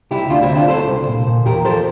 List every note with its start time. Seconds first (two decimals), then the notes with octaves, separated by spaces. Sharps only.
0.11 C2 E4 G4
0.29 D2 D4 F4
0.42 C4 E4
0.50 C3
0.55 D4 F4
0.68 C2 A4 C5
0.87 C2
1.07 A#2
1.27 A#2
1.45 E2 G4 A#4
1.65 F3 A4 C5